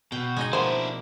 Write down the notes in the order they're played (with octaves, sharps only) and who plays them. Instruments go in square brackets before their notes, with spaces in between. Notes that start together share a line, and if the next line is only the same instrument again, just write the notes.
[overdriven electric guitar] B2 [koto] G5
[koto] G#3 D#4 D#5
[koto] B2 F3 A#3 [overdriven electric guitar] D4 E4 [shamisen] C5